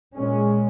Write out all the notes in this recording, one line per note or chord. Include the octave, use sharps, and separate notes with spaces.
A#2 G#3 C#4